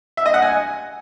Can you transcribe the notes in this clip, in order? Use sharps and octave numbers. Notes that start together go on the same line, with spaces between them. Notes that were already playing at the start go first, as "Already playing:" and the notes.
E5
D#5
F#5
G#5